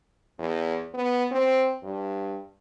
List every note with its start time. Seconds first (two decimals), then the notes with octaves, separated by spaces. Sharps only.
0.39 E2
0.94 B3
1.31 C4
1.83 G2